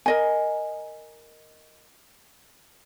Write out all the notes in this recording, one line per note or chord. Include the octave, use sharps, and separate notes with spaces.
A#4 D#5 G#5